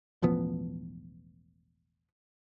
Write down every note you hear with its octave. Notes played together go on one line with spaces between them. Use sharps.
E1 A1 F3 B3